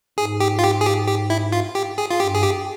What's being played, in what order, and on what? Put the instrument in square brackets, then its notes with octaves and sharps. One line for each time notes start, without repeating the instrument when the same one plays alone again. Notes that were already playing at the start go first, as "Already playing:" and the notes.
[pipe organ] G#2 [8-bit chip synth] G#4
[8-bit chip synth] G4
F4
G4
G#4
G4
G4
E4
F4
G4
G#4
F4
[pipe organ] G2 [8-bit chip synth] G4
[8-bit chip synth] G#4
G4